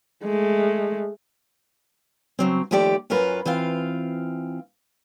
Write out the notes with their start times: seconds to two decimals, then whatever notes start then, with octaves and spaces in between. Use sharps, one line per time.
0.24 G#3 A3
2.39 C#3 F#3 C4
2.71 D#2 F3 A3 G4 D5
3.10 F#2 C#4 F4 A#4 B4
3.45 E3 C4 F4 F5